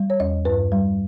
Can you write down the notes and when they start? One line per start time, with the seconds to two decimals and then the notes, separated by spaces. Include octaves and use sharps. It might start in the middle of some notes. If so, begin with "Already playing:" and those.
Already playing: G3
0.10 C#5
0.20 E2 D#5
0.45 G2 B4
0.72 G3